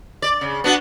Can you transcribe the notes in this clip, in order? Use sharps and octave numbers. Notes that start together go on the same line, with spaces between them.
D5
C#3
B3 D4 F#4